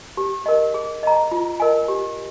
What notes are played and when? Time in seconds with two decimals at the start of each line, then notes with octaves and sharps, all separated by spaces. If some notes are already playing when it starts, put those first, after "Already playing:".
0.17 G4
0.46 A#4 D#5
0.74 G#4
1.03 D#5 A#5
1.31 F4
1.60 A#4 D#5 G#5
1.88 G4